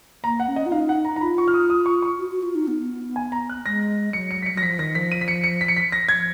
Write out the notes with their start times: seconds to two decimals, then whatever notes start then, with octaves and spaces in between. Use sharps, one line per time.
0.24 A#3 A#5
0.40 F#5
0.48 C#4
0.56 D#5
0.66 F4
0.72 D#4 F5
0.89 F#5
1.05 A#5
1.16 A#5
1.21 F4 B5
1.38 C#6
1.48 F6
1.54 D#6
1.70 D#6
1.86 C#6
2.02 C#6
2.19 F#4
2.32 F#4
2.43 F4
2.55 D#4
2.67 B3
3.16 G#5
3.32 A#5
3.49 F#6
3.65 G#3 A#6
4.13 F#3 C#7
4.31 C#7
4.42 B6
4.46 C#7
4.54 F#3 A#6
4.62 F3 B6
4.79 D#3 A#6
4.95 F3 B6
5.12 D#7
5.21 B6
5.28 C#7
5.44 C#7
5.61 B6
5.68 C#7
5.76 B6
5.92 A#6
6.08 F3 G#6